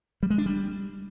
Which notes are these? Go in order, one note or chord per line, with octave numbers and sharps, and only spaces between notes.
G3
G#3
D4
G3